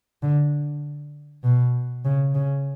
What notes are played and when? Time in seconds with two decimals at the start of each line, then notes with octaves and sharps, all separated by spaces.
0.23 D3
1.43 B2
2.05 C#3
2.35 C#3